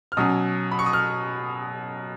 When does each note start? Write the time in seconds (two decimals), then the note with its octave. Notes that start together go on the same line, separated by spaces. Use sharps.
0.12 F6
0.17 B2 F#3 C#4 D#6
0.71 B5
0.79 C#6
0.86 D#6
0.93 F6